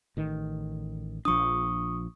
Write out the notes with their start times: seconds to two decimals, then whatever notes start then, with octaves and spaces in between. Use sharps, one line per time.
0.17 A1 D#3
1.25 A#1 F3 D4 C#6 D#6